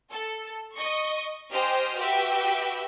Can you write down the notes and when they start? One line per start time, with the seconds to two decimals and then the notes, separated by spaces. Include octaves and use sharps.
0.11 A4
0.75 D#5 C#6
1.53 G4 C5 D#5 G5 G#5 F6
1.99 F#4 G4 B4 E5 G5